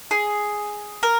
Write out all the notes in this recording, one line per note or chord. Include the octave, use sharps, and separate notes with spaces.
G#4
A#4